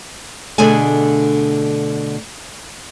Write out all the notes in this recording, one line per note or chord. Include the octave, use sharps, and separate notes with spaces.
B2 D3 A3 D4 G#4 G#5